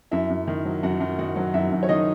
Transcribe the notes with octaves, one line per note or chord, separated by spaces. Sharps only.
F#2 E4 E5
F#2
D#3
F#3
F#2 F#4 F#5
F#2
D#3 F#4 F#5
F#3
F#2 E4 E5
F#2
C#5
D#3 D#4 D#5